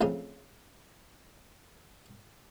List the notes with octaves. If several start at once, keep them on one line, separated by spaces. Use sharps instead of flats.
A1 F2 C#3 G#5 C6